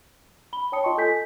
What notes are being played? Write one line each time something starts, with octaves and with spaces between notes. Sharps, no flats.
B5 G7
C#5 G5 A5 D#6 C#7
F4 D#5 A5 C6 C#6
A4 G#5 G6 B6